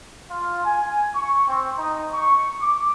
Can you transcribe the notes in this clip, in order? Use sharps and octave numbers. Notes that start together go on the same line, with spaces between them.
F4
G#5
C#6
C4
D#4
C#6
D6